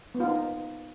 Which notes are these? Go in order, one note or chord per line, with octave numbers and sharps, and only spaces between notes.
B3
F4
D#4